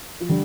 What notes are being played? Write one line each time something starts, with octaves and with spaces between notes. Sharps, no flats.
F3
D3 G3